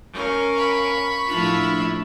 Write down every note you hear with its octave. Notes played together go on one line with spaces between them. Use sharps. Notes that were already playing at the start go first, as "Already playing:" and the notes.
C#4 A#4 F5
B5 C#6
A2 F3 D4 E4 F4